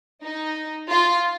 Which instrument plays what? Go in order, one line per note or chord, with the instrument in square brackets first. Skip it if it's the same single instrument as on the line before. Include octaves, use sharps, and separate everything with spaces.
[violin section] D#4
F4